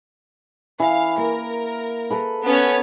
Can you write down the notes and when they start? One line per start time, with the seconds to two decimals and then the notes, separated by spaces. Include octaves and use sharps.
0.80 E3 F5
1.18 A#3 A#4
2.10 A4 B4 B5
2.44 B3 C#4 C#5